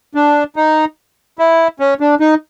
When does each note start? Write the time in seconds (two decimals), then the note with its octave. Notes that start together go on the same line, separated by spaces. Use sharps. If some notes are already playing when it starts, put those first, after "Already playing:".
0.15 D4
0.56 D#4
1.39 E4
1.80 C#4
2.00 D4
2.20 D#4